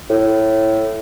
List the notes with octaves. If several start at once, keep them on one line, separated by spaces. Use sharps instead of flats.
A2